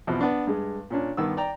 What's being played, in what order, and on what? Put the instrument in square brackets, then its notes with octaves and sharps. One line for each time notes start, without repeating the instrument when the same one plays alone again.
[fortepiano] E2 B2 F3 C4
B3 D4
G2 G#3
A#2 C#4 D4
G2 D#3 B3 E6
D5 G5 A#5